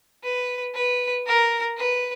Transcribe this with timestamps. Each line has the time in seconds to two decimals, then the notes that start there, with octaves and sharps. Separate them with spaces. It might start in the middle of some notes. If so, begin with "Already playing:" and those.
0.24 B4
0.75 B4
1.26 A#4
1.77 B4